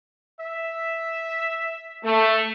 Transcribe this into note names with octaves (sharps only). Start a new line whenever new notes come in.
E5
A3 A4